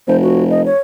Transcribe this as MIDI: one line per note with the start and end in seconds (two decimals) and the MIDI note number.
0.08 0.68 29
0.08 0.17 72
0.22 0.44 66
0.50 0.62 75
0.66 0.78 73